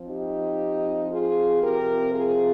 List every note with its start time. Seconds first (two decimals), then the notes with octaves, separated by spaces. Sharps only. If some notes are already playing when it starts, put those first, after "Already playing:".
Already playing: F3 C4
0.09 D#4 G4
1.12 F4 G#4
1.63 C3 F3 C4 G4 A#4
2.14 F4 G#4